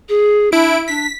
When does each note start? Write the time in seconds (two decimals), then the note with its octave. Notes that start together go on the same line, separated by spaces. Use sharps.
0.09 G#4
0.52 D4 E4 D7
0.88 D4 B6